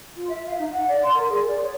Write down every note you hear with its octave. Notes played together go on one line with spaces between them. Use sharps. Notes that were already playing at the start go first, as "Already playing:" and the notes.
F4
E5
F5
D#4
F#5
D5
C6
A#4
G#4
D5
C#5